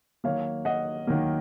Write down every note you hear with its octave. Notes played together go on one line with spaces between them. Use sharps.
D#3 F#3 A#3 C#5 F5
D#5 F#5
D#3 F#3 A#3